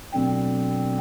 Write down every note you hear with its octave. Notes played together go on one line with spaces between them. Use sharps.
B2 F#3 A3 C4 D4